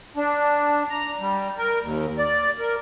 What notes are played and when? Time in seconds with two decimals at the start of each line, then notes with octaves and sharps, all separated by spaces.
0.16 D4
0.90 A#5
1.20 G3
1.58 A#4
1.82 D#2
2.19 D5
2.60 A#4